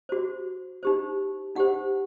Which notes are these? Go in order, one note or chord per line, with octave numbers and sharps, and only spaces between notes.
F#4 C5
D#4 G4 C5
D#4 G4 C5 F#5